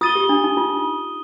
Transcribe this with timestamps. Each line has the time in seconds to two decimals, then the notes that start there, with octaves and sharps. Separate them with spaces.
0.01 F4 D#6 A6 D#7 G7
0.15 G4
0.29 D4
0.44 D#4
0.57 F4